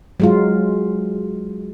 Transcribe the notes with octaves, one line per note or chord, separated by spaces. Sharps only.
F#3 G#3 F4